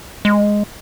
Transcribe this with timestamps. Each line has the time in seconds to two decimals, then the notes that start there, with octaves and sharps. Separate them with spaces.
0.25 G#3